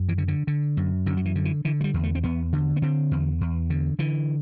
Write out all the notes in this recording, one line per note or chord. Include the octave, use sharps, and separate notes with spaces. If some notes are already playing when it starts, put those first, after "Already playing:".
Already playing: F#2
E3
D3
D3
D3
F#2
F#2 D3
F#3
E3
D3
E3
D3 E3
F#3
G3
E2
A3
C4
E2 B3
D3
B3
D3 C4
E2
E2
D3
D3 E3